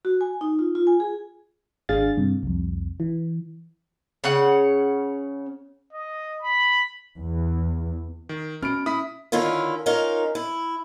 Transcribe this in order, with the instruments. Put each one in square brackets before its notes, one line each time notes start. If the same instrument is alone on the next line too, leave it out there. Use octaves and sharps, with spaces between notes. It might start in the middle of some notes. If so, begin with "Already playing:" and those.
[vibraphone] F#4
G#5
D#4
F4
F4
G#5
G#4
[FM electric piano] G#1 D4 G#4 F5 A6
G2 C3
C2 F2
E3
[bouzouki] C#3 C#4 F#5
[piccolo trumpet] D#5
B5
[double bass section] E2
[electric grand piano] D#3
[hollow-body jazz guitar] B2 [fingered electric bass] C#4 [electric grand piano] F6 D7
[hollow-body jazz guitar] E4 [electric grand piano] D#6 B6
[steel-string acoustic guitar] D3 D#3 C#4 E4 F4
C#4 D#4 F4 A#4 F5
E4